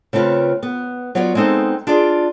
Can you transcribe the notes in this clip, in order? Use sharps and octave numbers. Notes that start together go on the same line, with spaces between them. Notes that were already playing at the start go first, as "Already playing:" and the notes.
C#3 A3 C4 F4 B4
B3
F#3 B3 F4 C#5 D5
G#3 B3 C4 D#4 A4
D4 F4 G#4 D5